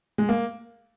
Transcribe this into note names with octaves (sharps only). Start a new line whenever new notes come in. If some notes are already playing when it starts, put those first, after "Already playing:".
G#3
A#3